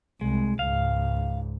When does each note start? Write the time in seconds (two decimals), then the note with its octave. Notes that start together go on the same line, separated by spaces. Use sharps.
0.21 C2 G#3
0.59 C#2 G#2 F5